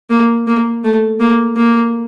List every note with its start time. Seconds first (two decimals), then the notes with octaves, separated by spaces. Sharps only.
0.10 A#3
0.47 A#3
0.84 A3
1.20 A#3
1.56 A#3